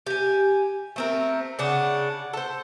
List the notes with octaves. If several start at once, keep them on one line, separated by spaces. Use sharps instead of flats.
G4 G#5
A3 C4 A#4
C#3 D4 F#5
A4 C5